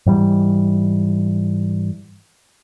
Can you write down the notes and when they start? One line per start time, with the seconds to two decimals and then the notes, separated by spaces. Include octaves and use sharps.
0.06 G#2 E3 G3